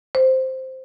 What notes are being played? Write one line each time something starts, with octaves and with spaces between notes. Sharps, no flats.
C5